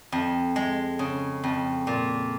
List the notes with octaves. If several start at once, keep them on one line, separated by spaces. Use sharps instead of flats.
F2
G#3
C#3
F2
A#2